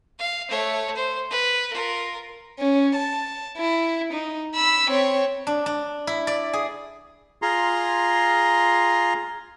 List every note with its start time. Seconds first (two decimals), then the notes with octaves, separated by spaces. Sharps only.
0.19 F5
0.48 A3 C#5
0.96 C5
1.30 B4
1.71 F4 A#4
2.60 C#4
2.95 A5
3.57 E4
4.13 D#4
4.56 B5 E6
4.91 C4 C#5
5.47 D4
5.66 D4
6.07 E4
6.27 D5
6.53 G#4
7.42 F4 G#4 A#5 C6